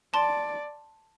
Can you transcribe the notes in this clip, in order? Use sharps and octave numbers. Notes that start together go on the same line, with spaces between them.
D5 A5 C6